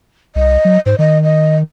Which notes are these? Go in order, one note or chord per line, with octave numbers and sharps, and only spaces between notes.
C2 D#5
F#3
G#2 C5
D#3 D#5
D#5